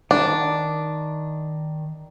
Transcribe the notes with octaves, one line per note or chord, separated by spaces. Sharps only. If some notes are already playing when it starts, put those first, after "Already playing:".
D#3 D4